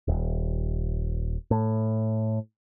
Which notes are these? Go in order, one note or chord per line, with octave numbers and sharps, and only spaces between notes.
D#1
A2